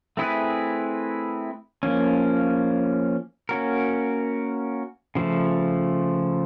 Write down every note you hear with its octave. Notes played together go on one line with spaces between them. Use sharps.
A3 C4 E4 G#4 B4
F3 A#3 C#4
A#3 C#4 F#4 A#4
C#3 F3 A3